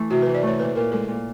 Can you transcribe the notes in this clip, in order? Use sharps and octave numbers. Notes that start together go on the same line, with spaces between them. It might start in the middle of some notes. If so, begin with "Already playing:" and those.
Already playing: E3 A3
C3 F#4
E3 B4
D5
A3 C#5
A#2 B4
A#2 A#4
G#3 A4
A#2